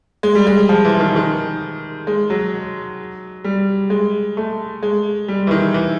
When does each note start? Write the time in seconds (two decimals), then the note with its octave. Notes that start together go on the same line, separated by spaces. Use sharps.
0.23 G#3
0.35 G3
0.47 G#3
0.69 F3
0.85 E3
1.00 D#3
1.16 D#3
2.07 G#3
2.30 F#3
3.44 G3
3.90 G#3
4.37 A3
4.83 G#3
5.28 G3
5.47 E3
5.51 D#3
5.74 E3